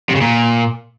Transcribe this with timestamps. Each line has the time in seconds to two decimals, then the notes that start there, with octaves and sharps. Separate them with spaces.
0.09 C3
0.15 C#3
0.21 A#2